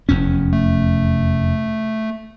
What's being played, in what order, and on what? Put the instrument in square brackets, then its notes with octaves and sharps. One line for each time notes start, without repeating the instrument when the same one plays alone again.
[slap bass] F1 E2 C#4
[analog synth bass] A3